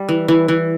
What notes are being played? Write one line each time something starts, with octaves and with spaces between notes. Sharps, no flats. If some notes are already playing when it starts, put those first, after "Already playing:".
Already playing: G3
E3
E3
E3